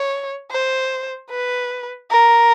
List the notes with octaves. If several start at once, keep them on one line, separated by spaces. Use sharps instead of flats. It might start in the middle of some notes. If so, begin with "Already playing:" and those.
Already playing: C#5
C5
B4
A#4